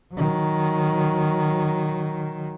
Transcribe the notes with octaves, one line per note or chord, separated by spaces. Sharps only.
D#3 F#3